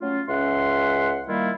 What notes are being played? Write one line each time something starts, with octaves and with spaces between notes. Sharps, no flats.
F#3 A3 C#4 F4
C#2 C#4 E5 F#5 C6
D#3 G3 A#3 E4 F4